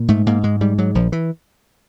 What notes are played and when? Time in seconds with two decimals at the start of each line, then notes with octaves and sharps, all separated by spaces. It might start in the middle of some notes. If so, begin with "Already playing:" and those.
Already playing: A#2
0.08 G#2 A3
0.26 G#2 A#3
0.43 G#2 G#3
0.61 G#2 G3
0.78 G#2 F#3
0.95 A#1 F3
1.12 E3